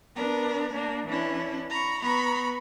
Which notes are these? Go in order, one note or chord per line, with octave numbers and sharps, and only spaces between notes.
B3 D4 A#4
A#3 D4
E3 C#4 D4 E4
A#5 B5 C#6
B3 A#5 B5 C#6